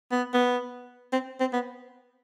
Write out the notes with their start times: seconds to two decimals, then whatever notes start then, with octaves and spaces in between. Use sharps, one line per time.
0.11 B3
0.34 B3
1.13 C4
1.40 C4
1.53 B3